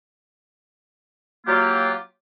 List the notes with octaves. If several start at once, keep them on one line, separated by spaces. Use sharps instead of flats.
F#3 A#3 F4 G4